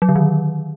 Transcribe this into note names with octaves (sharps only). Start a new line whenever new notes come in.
F#3
D3
D#3